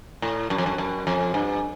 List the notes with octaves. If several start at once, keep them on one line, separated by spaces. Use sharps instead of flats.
A2
F#2
F2
F#2
F#2
F2
G2